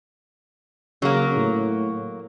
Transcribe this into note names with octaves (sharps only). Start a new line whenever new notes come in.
C#3 F#3 A#3
A2